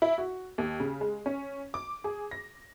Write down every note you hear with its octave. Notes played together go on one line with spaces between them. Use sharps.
E4
F#4
D#2
C#3
G#3
C#4
D6
G#4
A#6